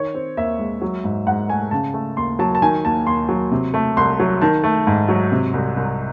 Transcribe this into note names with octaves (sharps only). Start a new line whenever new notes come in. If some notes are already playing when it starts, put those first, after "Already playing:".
Already playing: D#3 C#5
C4
D#2 E5
G#3
F#3
G#2
G#2 F#5
A3 G#5
C#3 A5
A3
D#2 C6
F#3 A5
A5
D#3 G#5
D#2 A5
D#2 C6
F#3
C3
A3
C2 C6
F#3
D#3 A5
A3
G#2
F#3
C3
C2
C2